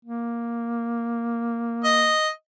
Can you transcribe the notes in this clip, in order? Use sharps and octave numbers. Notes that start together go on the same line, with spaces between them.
A#3
D#5